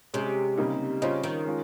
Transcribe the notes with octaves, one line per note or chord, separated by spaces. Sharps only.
C3 G#3 C#4 G#4
C#3 G3 A#3 D#4
C#3 G3 C#4 F4 C5 D#5
D#3
G#3 C#4 F4